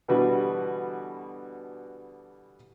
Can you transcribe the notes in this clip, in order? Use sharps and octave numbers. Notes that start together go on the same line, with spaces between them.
B2 D3 E3 G3 F#4 B4